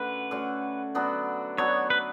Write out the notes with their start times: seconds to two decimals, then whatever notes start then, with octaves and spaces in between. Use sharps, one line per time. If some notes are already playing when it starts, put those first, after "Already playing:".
Already playing: D3 A3 C#4 F#4 B4
0.31 D3 A3 C#4 F#4
0.95 F#3 B3 D4 F#4
1.58 F#3 B3 D4 F#4 C#5
1.90 B4